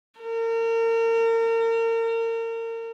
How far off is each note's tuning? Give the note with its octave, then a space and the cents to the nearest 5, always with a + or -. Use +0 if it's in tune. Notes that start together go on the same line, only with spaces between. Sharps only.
A#4 -35